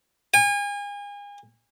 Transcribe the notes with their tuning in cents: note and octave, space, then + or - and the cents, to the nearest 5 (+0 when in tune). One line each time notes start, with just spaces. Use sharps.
G#5 -35